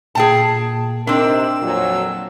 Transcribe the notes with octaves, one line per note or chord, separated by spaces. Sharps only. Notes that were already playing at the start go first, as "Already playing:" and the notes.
A#2 G#4 G5 A5
C3 C4 D4 D#4 A#4 E6
F2 A#2 F#3